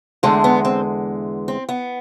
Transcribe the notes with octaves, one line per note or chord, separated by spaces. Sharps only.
E2 D3 G#3 A3
B3
C4
C4
B3